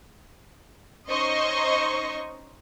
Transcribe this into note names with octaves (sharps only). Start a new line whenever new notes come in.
C#4 D#4 C5 D#5 C#6